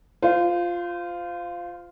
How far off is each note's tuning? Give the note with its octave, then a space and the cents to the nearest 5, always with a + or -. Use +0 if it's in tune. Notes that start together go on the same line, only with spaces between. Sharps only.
F4 +0 C5 -30